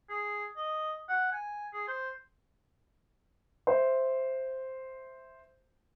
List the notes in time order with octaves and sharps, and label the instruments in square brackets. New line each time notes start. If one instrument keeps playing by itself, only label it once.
[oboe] G#4
D#5
F#5
G#5
G#4
C5
[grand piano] C5 E5